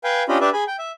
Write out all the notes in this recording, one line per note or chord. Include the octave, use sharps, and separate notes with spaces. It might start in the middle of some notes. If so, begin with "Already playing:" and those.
B4 F5 G5 G#5
C#4 D4 F4 G4 D#5 B5
D4 G4 B4 D5 E5
G#4 G#5 B5
G5
E5